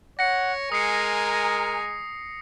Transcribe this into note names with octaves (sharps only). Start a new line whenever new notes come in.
C#5 F#5 A#6 C#7
G#3 A#4 G#5 A#5 D#6 C7 C#7